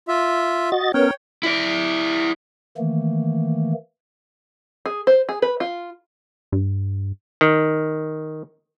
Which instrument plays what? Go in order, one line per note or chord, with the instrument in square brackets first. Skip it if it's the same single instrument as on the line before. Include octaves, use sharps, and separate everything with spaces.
[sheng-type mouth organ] F4 E5
[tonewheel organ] F#4 D#5 A6
[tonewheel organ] B3 C#4 A#4 [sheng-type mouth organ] C#5 G5
[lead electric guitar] E4 D5
[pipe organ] D#3 E3 A3 A#3
[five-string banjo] G#4
C5
G#4
B4
F4
[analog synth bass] G2
[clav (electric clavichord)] D#3